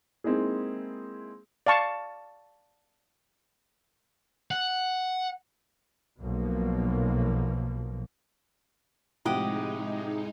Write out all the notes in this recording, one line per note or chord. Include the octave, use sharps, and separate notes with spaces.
G#3 A#3 C4 D#4 E4 G#4
D5 F5 A5 C#6
F#5
B1 B2 F3 A#3
A2 C3 F3 G#3 D#4 G4 D#5 F#5